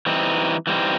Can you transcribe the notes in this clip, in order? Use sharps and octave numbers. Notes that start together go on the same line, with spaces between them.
E3 G3 C4 D#4
E3 G3 C4 D#4